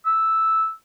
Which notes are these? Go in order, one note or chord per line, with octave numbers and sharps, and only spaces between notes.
E6